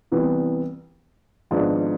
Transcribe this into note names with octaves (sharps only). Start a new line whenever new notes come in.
C2 C3 E3 B3
G#1 G#2 F3 B3 D4